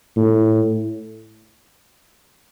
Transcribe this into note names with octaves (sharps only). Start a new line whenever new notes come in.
A2